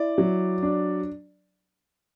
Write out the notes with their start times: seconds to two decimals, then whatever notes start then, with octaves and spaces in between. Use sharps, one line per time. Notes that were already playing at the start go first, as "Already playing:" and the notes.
Already playing: E4 D5
0.18 F#3
0.63 D4